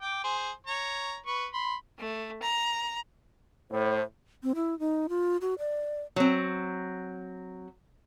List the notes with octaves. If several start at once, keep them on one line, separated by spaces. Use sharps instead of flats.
G5 D6
G#4 C5
C#5 A#5
B4 C#6
B5 C6
A3
A#5
A2 C5
C4
E4
D#4
F4
F#4
D5
F#3 C4